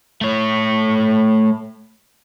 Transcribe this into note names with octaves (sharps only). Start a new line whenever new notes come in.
A3 C#5